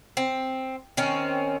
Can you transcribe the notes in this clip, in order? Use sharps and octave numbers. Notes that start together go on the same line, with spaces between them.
C4
D#3 C4 C#4